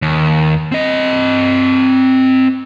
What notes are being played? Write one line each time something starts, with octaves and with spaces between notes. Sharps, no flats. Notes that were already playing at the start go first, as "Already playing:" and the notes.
D#2
C4 D#5